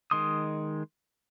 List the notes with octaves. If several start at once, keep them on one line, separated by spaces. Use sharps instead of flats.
D#3 G#3 C6 D#6